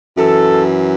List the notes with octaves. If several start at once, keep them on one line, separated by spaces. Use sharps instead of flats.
F#2 E3 A4